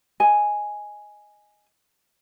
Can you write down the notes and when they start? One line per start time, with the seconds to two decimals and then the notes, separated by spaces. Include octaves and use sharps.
0.20 D#5 G#5